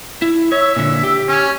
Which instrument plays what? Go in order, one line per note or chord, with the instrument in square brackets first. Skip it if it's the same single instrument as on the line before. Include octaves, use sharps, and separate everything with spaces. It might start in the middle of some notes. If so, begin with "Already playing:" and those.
[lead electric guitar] E4
[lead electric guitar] C#5 [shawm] E5
[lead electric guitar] A#2 D3
G4
[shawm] C#4